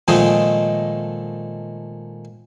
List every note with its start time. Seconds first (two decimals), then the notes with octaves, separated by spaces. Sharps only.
0.08 A#2 D#3 F3 G#3 A3 D#4